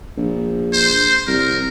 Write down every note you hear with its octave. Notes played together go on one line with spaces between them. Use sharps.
A#1
C5
C2 A#4